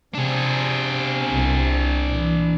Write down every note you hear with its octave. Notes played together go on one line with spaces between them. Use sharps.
C3 D4 G#4
C2
A#2 E3